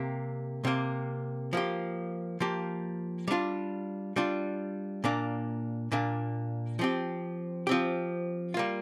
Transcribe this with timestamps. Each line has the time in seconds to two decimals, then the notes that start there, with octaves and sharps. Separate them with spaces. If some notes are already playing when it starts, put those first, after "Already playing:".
Already playing: C3 A#3 G4
0.65 C3 A#3 G4
1.53 F3 A#3 G4
2.40 F3 A#3 G4
3.28 G3 D4 F4
4.16 G3 D4 F4
5.04 A#2 A#3 D4
5.92 A#2 A#3 D4
6.79 F3 C4 G4
7.67 F3 C4 G4
8.54 G3 A#3 F4